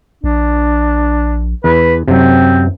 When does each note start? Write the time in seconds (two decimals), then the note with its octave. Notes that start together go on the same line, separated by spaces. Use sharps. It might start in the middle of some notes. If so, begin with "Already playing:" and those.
0.24 A#1 D4
1.64 E2 B4
2.08 F#2 C3 F#3 C4